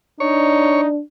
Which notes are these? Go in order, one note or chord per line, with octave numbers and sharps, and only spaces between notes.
D4 D#4 C#5